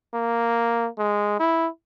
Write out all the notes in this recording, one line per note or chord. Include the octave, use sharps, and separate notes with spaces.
A#3
G#3
E4